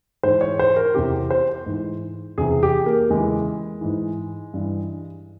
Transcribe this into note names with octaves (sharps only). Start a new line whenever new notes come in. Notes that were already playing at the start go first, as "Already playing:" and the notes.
G#2 E3 C5
C#5
C5
A#4
E2 C3 E3 G4
C5
G#2 E3
E2 C3 E3 G#4
G4
A#3
E2 C#3 E3 G#3
G#2 E3
G2 E3